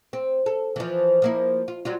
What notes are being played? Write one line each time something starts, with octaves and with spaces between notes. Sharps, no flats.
C4
A4
E3 F3
F3 A#3 E4
F4
F#3 G3 F4